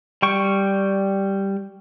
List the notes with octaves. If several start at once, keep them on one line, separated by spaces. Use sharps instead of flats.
G3 G5 C#6